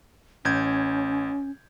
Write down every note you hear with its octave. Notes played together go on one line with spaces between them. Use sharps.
A1 C#4 G6 G#6